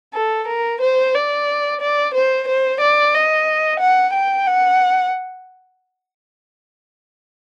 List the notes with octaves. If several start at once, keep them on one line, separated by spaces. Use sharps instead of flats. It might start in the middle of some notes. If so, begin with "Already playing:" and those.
A4
A#4
C5
D5
D5
C5
C5
D5
D#5
F#5
G5
F#5